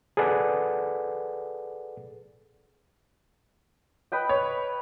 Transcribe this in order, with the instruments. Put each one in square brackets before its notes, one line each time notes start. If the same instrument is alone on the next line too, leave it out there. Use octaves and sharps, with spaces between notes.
[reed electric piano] G#4 A4 B4 D5 F#5
[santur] B4 D#5 G5
[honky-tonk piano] C#5